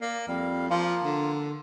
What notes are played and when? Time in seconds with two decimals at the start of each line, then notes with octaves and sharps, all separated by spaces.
0.01 A#3 D5
0.28 F2 G3 F5
0.70 F3 A#3 F4
1.03 D3